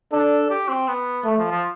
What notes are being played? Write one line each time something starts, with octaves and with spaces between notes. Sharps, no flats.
D4 A4
G4
C4
B3
A3
F3
F3